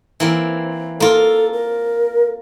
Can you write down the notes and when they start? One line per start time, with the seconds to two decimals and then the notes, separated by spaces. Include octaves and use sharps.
0.20 E3 A#3 C4
1.00 A#3 F4 A4
1.53 A#4